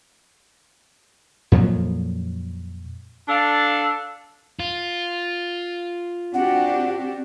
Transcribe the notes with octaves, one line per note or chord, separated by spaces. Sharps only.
F2 A#2 F3 F#3
D4 A4 F5
F4
C4 D4 F#4 G4 F#5